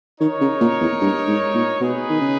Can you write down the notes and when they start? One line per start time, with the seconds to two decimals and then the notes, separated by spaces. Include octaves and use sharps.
0.20 D#3 D#4 A#4 C#5
0.41 C#3
0.61 A#2
0.81 E2
1.01 G2
1.27 G#2
1.54 A#2
1.81 B2 D#4 G#4 B4
2.10 D#3
2.21 C#3